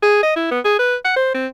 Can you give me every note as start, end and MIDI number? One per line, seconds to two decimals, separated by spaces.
0.02 0.18 68
0.23 0.33 75
0.36 0.51 64
0.51 0.60 59
0.65 0.75 68
0.79 0.96 71
1.05 1.16 78
1.16 1.34 72
1.34 1.47 60